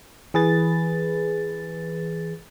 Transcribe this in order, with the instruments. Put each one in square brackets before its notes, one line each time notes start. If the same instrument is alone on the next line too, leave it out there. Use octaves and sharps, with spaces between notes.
[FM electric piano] E3 G#4 B4 A6